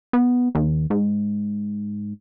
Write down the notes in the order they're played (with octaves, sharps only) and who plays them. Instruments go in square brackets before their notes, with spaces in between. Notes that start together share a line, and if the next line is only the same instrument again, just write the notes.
[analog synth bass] B3
D#2
G#2